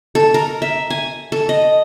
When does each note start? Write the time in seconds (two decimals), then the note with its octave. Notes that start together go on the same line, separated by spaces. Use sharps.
0.15 A4
0.34 A#4
0.62 E5
0.90 G#5
1.32 A4
1.49 D#5